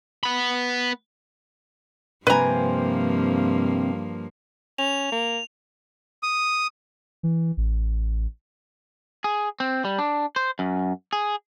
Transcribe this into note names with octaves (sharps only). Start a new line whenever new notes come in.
B3 B5
G2 C3 F3 A#3 C4 B4 G#5 A#5
C#4 F7
A#3
D#6
E3
A1
G#4
C4
G3
D4
C5
F#2
G#4